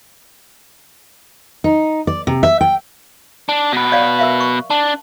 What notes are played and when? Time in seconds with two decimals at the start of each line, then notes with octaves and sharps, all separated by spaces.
1.64 D#4
2.07 D5
2.27 C3
2.43 E5
2.61 G5
3.49 D4
3.73 B2 B4
3.92 C#5 D5 F5
4.19 A#4 E5 F5
4.41 C#6
4.70 D4 A5